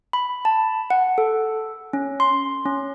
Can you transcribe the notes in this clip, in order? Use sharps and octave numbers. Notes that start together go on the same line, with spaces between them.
B5
A5
F#5
A4
C#4
C6
C#4